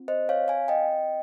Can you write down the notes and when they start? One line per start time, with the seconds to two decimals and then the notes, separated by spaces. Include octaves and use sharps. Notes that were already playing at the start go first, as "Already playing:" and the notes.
Already playing: C4 F4
0.08 C5 D#5
0.29 C#5 F5
0.48 F5 G#5
0.68 D#5 G5